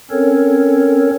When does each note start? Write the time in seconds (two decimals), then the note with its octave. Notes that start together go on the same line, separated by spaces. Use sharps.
0.11 C4 C#4 A4 A#4 C#5